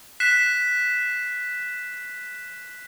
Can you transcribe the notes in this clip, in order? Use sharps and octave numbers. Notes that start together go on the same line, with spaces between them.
F#6 B6 C7 E7